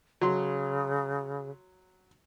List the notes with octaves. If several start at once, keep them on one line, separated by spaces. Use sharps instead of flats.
C#3 F#3 C6